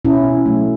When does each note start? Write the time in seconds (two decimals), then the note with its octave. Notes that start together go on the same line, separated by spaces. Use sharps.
0.05 B2 C#4 E4
0.46 F#3 A3